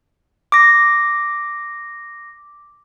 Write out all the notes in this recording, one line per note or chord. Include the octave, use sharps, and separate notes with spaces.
D6 A#6